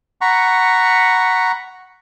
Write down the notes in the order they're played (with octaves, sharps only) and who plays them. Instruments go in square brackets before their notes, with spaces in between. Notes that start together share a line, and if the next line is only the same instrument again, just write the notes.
[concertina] F#5 A#5 B5 C#6